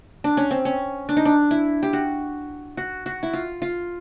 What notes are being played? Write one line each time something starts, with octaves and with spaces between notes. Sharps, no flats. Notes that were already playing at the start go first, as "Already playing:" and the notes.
D4
C#4
C4
C#4
D4
D#4
D4
E4
G4
F#4
F#4
F#4
E4
F4
F4